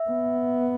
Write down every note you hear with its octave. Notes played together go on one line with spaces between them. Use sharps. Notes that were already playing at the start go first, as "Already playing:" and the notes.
Already playing: E5
B3